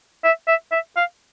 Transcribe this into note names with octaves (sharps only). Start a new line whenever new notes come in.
E5
E5
E5
F5